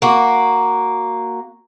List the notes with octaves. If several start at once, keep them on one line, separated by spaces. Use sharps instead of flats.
A#3 F#4